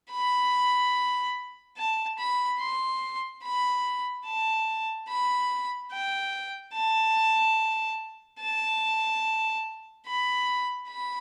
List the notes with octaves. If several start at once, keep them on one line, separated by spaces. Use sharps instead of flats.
B5
A5
B5
C6
B5
A5
B5
G5
A5
A5
B5
B5